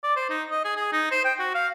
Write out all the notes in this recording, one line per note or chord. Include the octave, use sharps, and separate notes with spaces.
D5
C5
D#4
D#5
G#4
G#4
D#4
C5
G5
F#4
F5